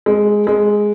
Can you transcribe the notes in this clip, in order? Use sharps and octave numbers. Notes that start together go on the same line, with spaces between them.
G#3
G#3